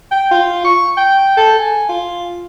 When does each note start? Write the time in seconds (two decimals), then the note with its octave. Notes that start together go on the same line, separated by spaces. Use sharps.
0.11 G5
0.31 F4
0.64 C#6
0.97 G5
1.37 A4
1.59 G#5
1.89 F4